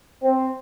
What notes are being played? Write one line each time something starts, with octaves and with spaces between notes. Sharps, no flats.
C4